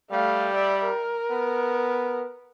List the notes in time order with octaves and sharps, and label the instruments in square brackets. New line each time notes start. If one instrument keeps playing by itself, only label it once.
[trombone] G3 [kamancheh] A3 F5
[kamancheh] D5 E5
A#4
[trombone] B3